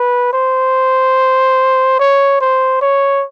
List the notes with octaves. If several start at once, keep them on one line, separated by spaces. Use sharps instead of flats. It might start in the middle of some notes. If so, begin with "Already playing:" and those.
Already playing: B4
C5
C#5
C5
C#5